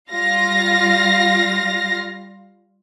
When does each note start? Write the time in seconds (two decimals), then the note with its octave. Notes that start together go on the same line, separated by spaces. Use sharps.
0.11 G3 F4 F5 A#6